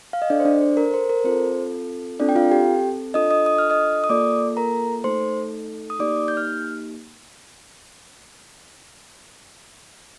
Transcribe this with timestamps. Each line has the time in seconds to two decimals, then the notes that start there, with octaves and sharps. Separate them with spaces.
0.13 F5
0.22 D#5
0.30 D4 A4 D5
0.40 C5
0.45 D4 D5
0.61 C5
0.77 A#4
0.94 C5
1.10 A#4
1.24 C4 F4 A4 C5
2.20 C4 D4 F4 A4 D5
2.29 G5
2.36 F4 F5
2.51 G4 G5
3.14 D4 F4 A4 D#5 D#6
3.31 D#5 D#6
3.46 D#6
3.58 F6
3.70 D#5 D#6
4.04 D#6
4.09 A#3 F4 A4 D5 D6
4.57 A#4 A#5
5.04 A3 D#4 A4 C5 C6
5.90 D#6
5.99 A#3 D#4 G4 D5 D6
6.28 G6
6.37 F6